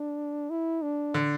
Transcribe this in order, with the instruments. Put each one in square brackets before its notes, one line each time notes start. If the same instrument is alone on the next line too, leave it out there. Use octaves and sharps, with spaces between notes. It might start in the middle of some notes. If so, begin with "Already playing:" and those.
Already playing: [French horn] D4
E4
D4
[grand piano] D3